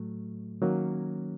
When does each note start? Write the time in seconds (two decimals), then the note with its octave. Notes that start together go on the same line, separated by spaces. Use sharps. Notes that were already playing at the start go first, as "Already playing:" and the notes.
Already playing: A2 F#3 A3
0.62 D#3 F#3 A#3 C#4